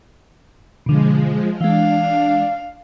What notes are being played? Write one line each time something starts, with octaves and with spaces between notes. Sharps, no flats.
B2 D3 F3 G#3
E3 G#3 D4 F5